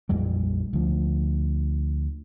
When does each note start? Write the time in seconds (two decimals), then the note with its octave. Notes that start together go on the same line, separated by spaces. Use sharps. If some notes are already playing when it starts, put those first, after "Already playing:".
0.09 A#1 F2 G3 G#3
0.73 D2 F3